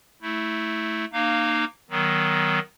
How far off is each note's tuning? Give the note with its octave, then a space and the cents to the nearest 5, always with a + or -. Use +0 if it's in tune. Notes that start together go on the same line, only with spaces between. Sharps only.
A3 +0 E4 -15
A#3 +0 D#4 -30 F5 +0
D#3 +5 F#3 +25 B3 -5